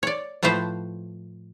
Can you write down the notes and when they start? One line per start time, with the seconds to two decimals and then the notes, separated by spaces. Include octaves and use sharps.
0.03 C#5 D5
0.43 A2 F3 A3 B4 C5